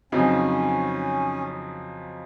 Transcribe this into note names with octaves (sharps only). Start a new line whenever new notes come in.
F2 C#3 F#3 C4 C#4 D#4